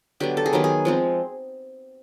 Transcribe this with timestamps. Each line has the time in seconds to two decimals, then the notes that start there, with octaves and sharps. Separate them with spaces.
0.20 D3 F#3 B3 G4
0.37 A4
0.46 G#4
0.53 D#3 F#3 B3 G4
0.64 G#4
0.85 F3 G#3 C4